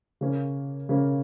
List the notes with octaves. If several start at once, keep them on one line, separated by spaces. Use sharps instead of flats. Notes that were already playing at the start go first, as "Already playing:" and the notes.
C#3 A#3 C#4
C#3 A#3 C#4